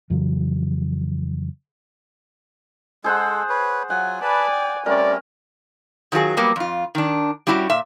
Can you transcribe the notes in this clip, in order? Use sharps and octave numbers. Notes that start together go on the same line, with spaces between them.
F2 C#3 E3 F#3
G#3 G#4 A4 C5 F#5
B4 C#5
F#3 F4 F#5 G#5
B4 D5 G#5 A5 B5
G5
G3 A3 C4 C#4 A#4 D5
D#3 F#3 F4 F#4 G#4
F#3 G3 A#3 B3
F2 F4
D#3 D4
G3 C#4 E4 F#4 G4
A#2 E5